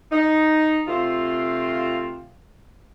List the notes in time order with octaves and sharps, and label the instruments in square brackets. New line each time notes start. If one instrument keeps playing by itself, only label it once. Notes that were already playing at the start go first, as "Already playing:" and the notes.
[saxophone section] D#4
C3 A3 C4 F4